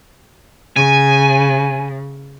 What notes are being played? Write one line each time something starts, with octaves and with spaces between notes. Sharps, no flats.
C#3 G#5